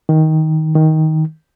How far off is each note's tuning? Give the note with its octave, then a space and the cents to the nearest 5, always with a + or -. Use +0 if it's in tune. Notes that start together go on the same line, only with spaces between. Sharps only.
D#3 +15
D#3 +15